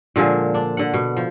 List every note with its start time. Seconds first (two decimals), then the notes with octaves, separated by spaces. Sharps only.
0.16 A#2 D3 F3 G#3
0.54 D4
0.77 D3 F#5
0.94 B2
1.17 F3